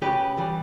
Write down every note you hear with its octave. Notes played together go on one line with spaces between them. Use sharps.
C#3 G4 B4
E3 G3